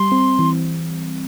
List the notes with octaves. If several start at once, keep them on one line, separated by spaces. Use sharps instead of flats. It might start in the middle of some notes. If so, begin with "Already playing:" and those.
Already playing: G3 C6
C4
E3